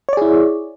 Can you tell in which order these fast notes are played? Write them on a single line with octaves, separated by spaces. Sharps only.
C#5 D5 G#4 E4